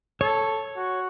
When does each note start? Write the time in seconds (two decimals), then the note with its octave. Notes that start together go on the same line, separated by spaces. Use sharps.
0.21 A4 C#5
0.77 F#4